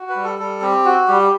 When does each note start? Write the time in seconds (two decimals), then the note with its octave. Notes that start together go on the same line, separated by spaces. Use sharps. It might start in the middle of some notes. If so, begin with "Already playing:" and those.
Already playing: F#4
0.09 B4
0.15 G3
0.24 A4
0.39 G3 A4
0.61 C4 G4
0.85 F#4
1.08 G3 G4